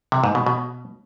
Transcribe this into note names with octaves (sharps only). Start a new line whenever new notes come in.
C3
G#2
B2
B2